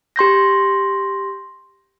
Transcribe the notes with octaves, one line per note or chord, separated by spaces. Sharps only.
G4 C6 G6 A#6